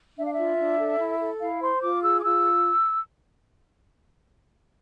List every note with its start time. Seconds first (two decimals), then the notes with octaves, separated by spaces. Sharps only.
0.17 D4 E5
0.25 F5
0.33 E5
0.38 F4
0.58 D4
0.79 A4
0.99 E4
1.20 A4
1.41 E4 F5
1.61 C5 C6
1.82 F4 D6
2.02 G#4 E6
2.20 D6
2.23 F4 E6